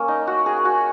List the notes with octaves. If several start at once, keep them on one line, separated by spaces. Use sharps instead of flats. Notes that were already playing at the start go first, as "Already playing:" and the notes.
Already playing: A#3 C#4
D#4
F#4
G#4
F#4